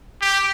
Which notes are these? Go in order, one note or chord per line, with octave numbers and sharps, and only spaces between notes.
G4